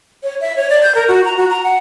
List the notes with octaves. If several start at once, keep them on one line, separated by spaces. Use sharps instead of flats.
C#5
E5
C#5
D5
G6
A#4
F#4
A#5
F#4
A#5
F#5